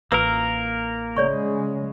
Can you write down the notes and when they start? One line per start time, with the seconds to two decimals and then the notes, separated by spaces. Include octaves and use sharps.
0.12 A1 A#3 F4 A#4 B4 E6
1.16 C#3 G#3 C#5 D5 C#6